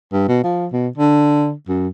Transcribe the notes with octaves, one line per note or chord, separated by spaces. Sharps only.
G2
B2
F3
B2
D3
F#2